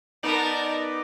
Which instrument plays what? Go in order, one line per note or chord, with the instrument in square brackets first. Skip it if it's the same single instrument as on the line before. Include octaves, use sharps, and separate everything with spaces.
[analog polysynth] B3 D#4 D5 [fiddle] A#4 A5